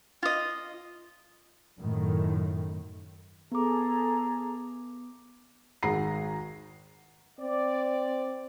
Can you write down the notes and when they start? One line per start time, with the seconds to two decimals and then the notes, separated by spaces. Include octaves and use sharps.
0.23 F4 D#5
1.81 F#2 A2 D#3
3.52 B3 G#4 A4 A#5 D6
5.83 G#1 D#3 G#4 F#5 A#5 C7
7.40 C4 D5